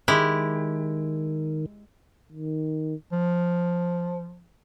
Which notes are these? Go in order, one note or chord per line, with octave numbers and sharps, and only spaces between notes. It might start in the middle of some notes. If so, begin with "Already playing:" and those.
D#3 G#3 E4 G4
D#3
F3